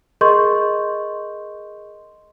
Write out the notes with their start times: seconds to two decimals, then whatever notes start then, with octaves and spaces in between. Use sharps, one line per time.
0.21 G#4 A#4 D#5 C6 C#6 G6